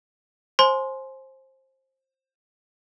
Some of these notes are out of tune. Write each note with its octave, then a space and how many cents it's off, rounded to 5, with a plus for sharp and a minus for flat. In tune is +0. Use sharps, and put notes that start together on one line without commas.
C5 +20 G#5 +30 C6 +0